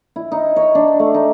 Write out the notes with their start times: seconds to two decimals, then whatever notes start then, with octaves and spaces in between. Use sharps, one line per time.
0.16 E4
0.32 D#4
0.56 C#5
0.75 D4
0.99 A3
1.14 D#4